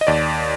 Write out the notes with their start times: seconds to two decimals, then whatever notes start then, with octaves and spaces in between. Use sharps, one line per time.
0.01 D#5
0.07 D#2 D5